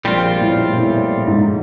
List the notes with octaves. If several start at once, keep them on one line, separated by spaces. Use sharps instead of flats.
A#1 A#2 G3 C4 F4
A2
A#2
A2
G#2